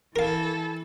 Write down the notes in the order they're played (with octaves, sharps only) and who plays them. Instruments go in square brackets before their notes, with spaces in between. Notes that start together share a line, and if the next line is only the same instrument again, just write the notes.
[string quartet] E3 A4 [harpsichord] A#4 F5